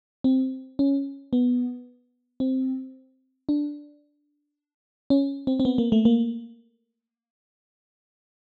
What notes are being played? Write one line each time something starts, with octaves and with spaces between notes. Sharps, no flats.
C4
C#4
B3
C4
D4
C#4
C4
C4
B3
A#3
A3
A#3